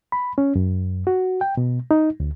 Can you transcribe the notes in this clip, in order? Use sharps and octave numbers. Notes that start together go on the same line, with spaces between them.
B5
C#4
F#2
F#4
G5
B2
D#4
D2